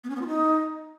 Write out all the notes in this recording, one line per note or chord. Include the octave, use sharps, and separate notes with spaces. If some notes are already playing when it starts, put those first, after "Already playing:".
B3
C#4
B3
F4
D#4